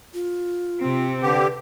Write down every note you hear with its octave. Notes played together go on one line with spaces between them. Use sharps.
F4
C3 C4
D3 G4 B4